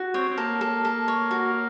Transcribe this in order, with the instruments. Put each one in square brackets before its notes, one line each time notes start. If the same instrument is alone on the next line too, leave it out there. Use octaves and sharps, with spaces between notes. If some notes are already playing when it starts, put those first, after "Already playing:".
Already playing: [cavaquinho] F#4
[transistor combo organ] C4 [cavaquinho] C#5
[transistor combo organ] C4
[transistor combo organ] A#3 [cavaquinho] A4
[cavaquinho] A4
A4
C#5
F#4